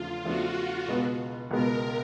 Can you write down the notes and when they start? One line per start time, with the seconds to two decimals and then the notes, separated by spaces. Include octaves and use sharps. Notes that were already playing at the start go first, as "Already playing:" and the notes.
Already playing: E2 C#3 F3 A3 D4 F4
0.25 E2 C#3 F3 A3 D4 F#4
0.88 C#2 B2 G#3 B3
1.51 C#2 B2 G#3 B3 A#4